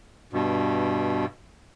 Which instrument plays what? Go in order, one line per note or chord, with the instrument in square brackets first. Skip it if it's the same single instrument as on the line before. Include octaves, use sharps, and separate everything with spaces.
[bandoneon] G2 B2